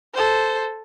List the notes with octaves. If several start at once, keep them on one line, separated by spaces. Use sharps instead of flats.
A4 C5